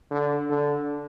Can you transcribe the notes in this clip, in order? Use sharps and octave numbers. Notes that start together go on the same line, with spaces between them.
D3
D3